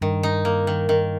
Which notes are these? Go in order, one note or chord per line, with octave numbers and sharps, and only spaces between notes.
G2 D#3
D#4
A#3
D#3
D#3